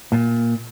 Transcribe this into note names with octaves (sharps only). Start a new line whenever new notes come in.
A#2